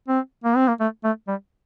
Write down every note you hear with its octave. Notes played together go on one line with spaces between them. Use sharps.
C4
A#3
C4
A#3
A3
A3
G3